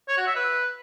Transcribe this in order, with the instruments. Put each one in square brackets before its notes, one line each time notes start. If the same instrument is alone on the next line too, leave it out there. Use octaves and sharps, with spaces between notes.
[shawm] C#5
F#4
E5
B4